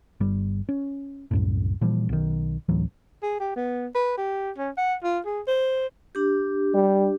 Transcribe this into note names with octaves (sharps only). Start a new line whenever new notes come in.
G1 G3
C#4
C2 F#2 A2
A#2 E3 F3 G3
B1 D#3
A1 D2 E3 F#3
G#4
G4
B3
B4
G4
C#4
F#5
F4
G#4
C5
D4 G4
G3